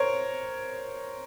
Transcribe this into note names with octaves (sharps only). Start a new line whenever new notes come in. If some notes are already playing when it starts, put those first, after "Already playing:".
Already playing: A#4 C5 C#5